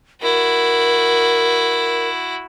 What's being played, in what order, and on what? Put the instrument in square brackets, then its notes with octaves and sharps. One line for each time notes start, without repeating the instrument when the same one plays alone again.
[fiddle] E4 F#4 [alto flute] A#4